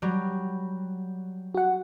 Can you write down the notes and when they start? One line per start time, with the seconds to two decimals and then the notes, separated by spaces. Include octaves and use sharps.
0.02 F#3 G3
1.55 F#4 F#5